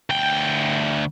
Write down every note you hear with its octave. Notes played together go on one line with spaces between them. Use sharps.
D2 G5